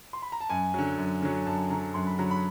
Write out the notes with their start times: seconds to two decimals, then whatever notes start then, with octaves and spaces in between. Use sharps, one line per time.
0.13 C6
0.22 B5
0.32 A#5
0.41 A5
0.50 F#2 G#5
0.74 D3 F#3
0.98 F#2
1.22 D3 F#3
1.46 F#2 A5
1.70 D3 F#3 A#5
1.94 F#2 C6
2.07 B5
2.18 D3 F#3 A#5
2.31 B5